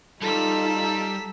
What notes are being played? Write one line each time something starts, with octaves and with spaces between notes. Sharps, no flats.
G3 D#4 F4 A4 A#5 E6 B6